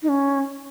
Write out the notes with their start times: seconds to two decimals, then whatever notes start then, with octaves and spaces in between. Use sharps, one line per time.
0.03 D#4
0.09 C#4